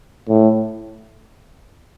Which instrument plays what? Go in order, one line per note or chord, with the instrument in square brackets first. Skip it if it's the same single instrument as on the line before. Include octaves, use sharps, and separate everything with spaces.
[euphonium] A2